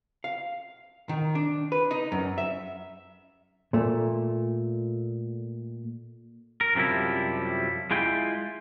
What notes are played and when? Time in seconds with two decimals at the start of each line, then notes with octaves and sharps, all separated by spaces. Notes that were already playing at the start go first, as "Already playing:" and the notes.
0.24 F5
1.09 D#3
1.35 D4
1.72 B4
1.91 D#4
2.12 F#2
2.38 E5
3.73 A#2 A3
6.61 A#4
6.75 F#2 C3 F3 G3 E4
7.91 G#3 E4 F4 G5